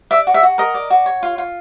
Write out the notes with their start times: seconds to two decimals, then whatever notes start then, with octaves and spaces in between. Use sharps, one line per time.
0.11 D5 E5
0.27 F#4
0.34 E5
0.43 F#4
0.58 A#4 D#5
0.74 D5
0.90 F#4
1.06 C#5
1.23 F4
1.38 F4